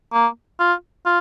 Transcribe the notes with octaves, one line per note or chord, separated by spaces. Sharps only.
A#3
F4
F4